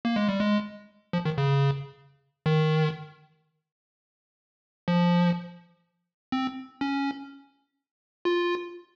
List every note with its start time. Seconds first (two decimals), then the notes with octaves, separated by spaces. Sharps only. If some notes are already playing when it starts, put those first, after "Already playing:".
0.05 A#3
0.16 G#3
0.29 G3
0.40 G#3
1.13 F3
1.25 D#3
1.38 C#3
2.46 D#3
4.88 F3
6.32 C4
6.81 C#4
8.25 F4